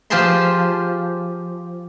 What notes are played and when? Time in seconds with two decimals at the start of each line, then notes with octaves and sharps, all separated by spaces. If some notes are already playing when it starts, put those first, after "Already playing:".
0.10 F3 F4 G4 G#4 A5 C6